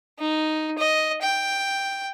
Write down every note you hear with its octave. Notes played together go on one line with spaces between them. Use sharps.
D#4
D#5
G5